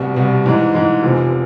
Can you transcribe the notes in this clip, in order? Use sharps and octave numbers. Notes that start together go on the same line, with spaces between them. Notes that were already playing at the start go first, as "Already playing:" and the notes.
Already playing: C2 B2 G3
C2 B2 G3
G#2 E3 G#3
G#2 E3 G#3
F1 E2 C3 F3